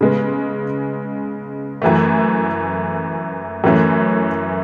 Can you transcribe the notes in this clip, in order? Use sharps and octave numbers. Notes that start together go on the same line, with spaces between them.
C#3 G#3 B3
F#2 E3 A3
F#2 E3 A3 C#4